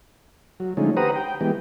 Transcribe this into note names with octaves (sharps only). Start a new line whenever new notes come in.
F#3
D3 F3 G#3 A3 C#4 D#4
G4 B4 C5 F#5 A#5 D#6
G5
E3 G#3 B3 G4